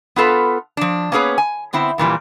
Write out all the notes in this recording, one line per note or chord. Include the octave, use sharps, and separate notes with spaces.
B3 F4 A4 B4
F3 D4
A#3 B3 C#4 G#4 B4 C#5
G#5
D3 B3 C4 E4
F2 A#2 E3 G3